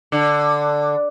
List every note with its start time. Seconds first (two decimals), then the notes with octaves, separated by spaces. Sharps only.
0.12 D3